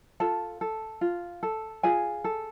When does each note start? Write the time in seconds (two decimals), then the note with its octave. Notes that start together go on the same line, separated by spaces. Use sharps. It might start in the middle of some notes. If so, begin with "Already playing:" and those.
0.20 F4 A4 A5
0.61 A4
1.01 F4
1.43 A4
1.83 F4 G#4 G#5
2.24 A4